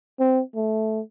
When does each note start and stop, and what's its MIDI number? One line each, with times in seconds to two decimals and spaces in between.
0.19 0.41 60
0.55 1.00 57